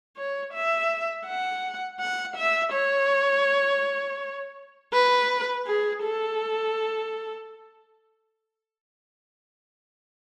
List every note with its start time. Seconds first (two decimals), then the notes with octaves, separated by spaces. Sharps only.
0.17 C#5
0.53 E5
1.27 F#5
2.00 F#5
2.37 E5
2.73 C#5
4.94 B4
5.67 G#4
6.03 A4